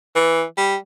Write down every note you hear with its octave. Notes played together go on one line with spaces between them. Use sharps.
E3
G3